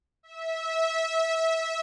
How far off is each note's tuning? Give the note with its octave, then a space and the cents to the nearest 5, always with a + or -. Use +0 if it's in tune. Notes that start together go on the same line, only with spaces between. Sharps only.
E5 -20